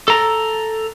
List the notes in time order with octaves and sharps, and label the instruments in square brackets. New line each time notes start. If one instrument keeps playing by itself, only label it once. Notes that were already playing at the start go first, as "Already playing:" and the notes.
[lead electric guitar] A4 A#5